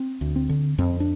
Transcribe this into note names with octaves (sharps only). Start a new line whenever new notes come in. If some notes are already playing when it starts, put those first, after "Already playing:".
Already playing: C4
D2
C4
D3
F2 C4
D4